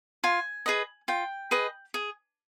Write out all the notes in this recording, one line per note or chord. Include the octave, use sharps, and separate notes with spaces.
F4 G#5
G#4 B4 D#5
F4 G5
G#4 B4 D#5
G#4